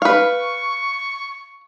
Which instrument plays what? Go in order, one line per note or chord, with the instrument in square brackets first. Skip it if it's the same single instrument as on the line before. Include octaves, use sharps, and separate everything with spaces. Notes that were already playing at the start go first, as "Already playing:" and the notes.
[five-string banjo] B4 F5 [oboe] C#6